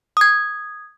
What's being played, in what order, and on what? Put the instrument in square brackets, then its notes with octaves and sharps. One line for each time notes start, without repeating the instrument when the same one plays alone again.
[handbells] D#6 G#6